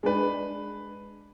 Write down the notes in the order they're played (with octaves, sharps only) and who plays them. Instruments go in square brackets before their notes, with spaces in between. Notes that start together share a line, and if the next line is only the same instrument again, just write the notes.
[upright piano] G#3 D4 B4